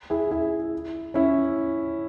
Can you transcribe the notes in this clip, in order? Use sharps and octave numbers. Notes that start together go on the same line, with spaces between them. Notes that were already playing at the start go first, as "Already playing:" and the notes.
E4 G#4
E4 G#4
C#4 E4